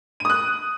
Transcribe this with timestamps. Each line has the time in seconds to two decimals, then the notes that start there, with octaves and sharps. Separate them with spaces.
0.20 D#7
0.25 D#6
0.30 F#6